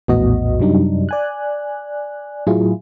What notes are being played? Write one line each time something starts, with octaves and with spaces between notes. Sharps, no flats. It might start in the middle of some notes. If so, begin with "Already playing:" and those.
A#1 E2 A2 B3 F#4 D#5
F#2 C3 F#3 G3 D4 D#4
D5 G#5 F#6
A2 F#3 E4 F4 G#4